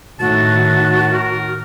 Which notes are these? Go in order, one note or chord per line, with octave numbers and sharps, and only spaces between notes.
A2 D#3 F#4 A5
A#4